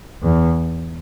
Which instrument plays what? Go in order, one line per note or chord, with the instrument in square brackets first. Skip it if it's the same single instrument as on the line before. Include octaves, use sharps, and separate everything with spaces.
[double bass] E2